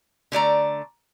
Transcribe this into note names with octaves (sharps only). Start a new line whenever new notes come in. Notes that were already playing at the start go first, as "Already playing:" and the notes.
D3 A3 D5 A#5